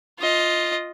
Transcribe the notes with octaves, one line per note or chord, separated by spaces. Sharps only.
F4 D#5